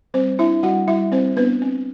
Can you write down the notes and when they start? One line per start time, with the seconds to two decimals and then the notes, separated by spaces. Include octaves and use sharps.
0.14 G3 C4 C5
0.39 D4 E4 E5
0.63 G3 F#4 F#5
0.88 G3 E4 E5
1.12 G3 C4 C5
1.36 B3 D4 B4
1.62 C4